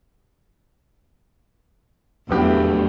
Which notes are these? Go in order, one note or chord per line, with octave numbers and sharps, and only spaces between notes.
F1 E2 A2 F#3 A3 B3 D4 G4